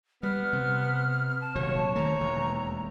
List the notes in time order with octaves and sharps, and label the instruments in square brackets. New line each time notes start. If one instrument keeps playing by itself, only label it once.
[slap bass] G3 [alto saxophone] B3 [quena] F6
[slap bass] C3
[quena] A5
[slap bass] D#1 C3 F#3 [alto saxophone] C#5
[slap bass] D#3 A3 [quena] A#5
[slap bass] E1 D#2